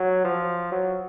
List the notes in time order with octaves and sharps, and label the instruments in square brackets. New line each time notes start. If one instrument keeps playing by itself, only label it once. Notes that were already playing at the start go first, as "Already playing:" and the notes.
Already playing: [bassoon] F#3
F3
F#3